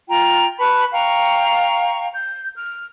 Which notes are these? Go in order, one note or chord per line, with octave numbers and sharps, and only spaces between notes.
F4 G5 A#5
B4 A5 B5 C#6
F5 G5 A#5 C#6
G6
F6